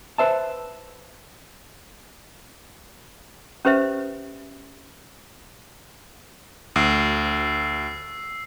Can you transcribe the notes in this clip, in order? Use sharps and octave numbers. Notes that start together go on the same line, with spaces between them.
B4 C5 E5 A5
C#4 G4 B4 C5 E5
D2 E6 C7